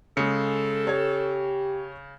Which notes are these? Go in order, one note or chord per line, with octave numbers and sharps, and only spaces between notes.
C#3 G#3 A4 C#7
G4 C#5 G#6